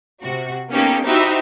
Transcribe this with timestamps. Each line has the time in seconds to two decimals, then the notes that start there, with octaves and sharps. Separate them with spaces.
0.22 C3 F#4
0.71 A#3 B3 C#4 D#4 G4 A4
1.06 D#4 E4 F#4 G4 C5 E5